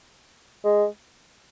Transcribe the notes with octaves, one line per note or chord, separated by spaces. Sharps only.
G#3